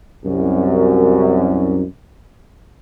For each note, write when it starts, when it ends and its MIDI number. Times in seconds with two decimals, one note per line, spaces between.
0.25 1.83 36
0.25 1.83 42